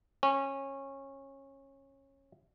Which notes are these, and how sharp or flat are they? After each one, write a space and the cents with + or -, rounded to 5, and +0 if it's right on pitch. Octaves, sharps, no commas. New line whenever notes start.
C#4 -20